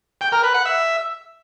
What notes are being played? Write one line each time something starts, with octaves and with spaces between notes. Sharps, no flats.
G5
A#4
B4
F#5
E5